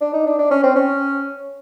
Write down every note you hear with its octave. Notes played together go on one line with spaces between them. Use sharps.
D4
D#4
D4
D4
C#4
C4
C#4